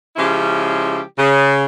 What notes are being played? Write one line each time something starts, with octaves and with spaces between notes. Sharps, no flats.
C#3 F3 G#3 C#4 E4 G4
C#3